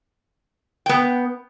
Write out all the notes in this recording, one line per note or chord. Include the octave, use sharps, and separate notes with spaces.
B3 G5